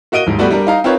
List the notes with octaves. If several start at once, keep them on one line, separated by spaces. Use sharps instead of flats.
A#3 F#4 D#5 D7 D#7 G7
D#1 G#2
G3 A3 B3 F#4 D5
G3 D4 A#4
D#4 F5 A#5
C4 D#4 F4 A#4 B4 C#5